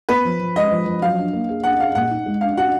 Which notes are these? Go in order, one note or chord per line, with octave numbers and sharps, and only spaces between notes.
B3 B4
F3
F3
G#3 D#5
F3
F3
F#3 F5
D4
A#3
G#4
D4 F#5
G#4 F5
A#2 F#5
D#4
G#3
D4 F5
F#4 F#5